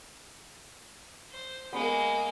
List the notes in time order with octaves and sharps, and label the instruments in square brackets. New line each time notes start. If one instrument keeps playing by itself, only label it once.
[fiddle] C5
[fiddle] G#3 A#3 [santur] B3